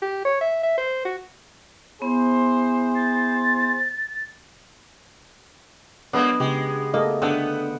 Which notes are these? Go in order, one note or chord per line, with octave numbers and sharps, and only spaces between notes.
G4
C#5
E5
E5
C5
F#4
B3 E4 G#4 C5
A6
F#3 G#3 A#3 B3 D4
C#3 G#3 G4
A3 A#3 A4 D#5
D3 B3 F#5 G5 E6